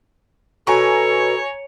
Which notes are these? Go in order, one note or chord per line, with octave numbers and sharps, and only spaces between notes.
B2 A4 C#5 G#5 A#5 C#6